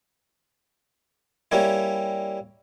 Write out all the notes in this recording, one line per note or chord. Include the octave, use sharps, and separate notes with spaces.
G3 A#3 C#4 E4